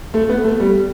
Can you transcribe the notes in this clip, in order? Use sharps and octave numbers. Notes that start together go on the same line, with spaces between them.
A3
B3
A3
G3